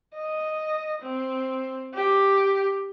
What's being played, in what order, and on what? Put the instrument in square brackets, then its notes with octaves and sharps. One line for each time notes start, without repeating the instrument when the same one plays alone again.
[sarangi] D#5
C4
G4